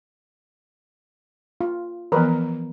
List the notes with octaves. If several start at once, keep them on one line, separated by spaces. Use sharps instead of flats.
F4
E3 F3 B3 A#4 B4